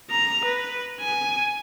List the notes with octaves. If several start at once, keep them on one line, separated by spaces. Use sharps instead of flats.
A#5
B4
G#5